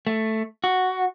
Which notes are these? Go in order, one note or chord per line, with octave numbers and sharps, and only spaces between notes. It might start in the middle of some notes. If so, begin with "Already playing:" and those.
A3
F#4